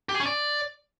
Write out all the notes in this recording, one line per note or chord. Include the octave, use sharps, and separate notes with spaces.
G4
G#4
C#4
D5